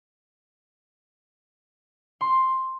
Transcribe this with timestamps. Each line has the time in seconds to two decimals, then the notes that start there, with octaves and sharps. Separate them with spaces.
2.21 C6